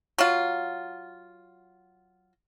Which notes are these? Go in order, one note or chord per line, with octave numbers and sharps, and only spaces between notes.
F#3 F4